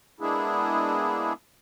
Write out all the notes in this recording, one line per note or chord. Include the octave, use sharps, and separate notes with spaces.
G#3 A#3 B3 D4 E4 G#4